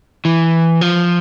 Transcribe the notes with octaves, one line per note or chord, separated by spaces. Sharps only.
E3
F3